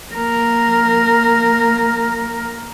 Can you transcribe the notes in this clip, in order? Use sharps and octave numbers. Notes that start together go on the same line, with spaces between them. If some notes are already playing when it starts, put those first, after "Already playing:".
A#3 A#4